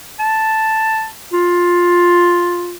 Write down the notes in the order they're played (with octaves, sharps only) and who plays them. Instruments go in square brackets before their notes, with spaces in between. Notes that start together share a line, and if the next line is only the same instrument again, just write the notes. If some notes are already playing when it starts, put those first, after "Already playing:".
[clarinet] A5
F4